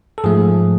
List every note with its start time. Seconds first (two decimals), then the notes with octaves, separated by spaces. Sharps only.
0.18 A4
0.24 G#2 F3 A3 G#4